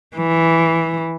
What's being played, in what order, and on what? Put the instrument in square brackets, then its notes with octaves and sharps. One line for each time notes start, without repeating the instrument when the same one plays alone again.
[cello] E3